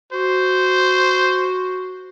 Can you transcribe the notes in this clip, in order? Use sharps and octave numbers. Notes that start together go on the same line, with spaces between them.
F#4 C5